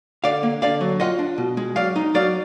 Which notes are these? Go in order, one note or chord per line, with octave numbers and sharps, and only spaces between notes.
D3 D5 F5
A#3
D3 D5 F5
F#3
F4 D#5 F#5
D4
B2
G#3
F#3 D5 F5
D#4
F#3 D5 F5